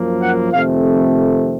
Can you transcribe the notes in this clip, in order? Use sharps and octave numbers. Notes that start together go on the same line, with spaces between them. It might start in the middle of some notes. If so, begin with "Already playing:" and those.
Already playing: F#2 F3 A#3
F#5
F2 C3 D#3 A3 C4 F5